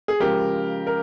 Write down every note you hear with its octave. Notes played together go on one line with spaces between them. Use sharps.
G#4
C#3 F3 G#3 G4 A#4
A#4